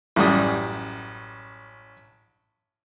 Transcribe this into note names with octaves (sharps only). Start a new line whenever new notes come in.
A1 F#2 G3 D#6